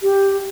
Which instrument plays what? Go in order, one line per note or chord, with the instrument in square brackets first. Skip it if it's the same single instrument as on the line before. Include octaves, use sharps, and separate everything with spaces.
[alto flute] G4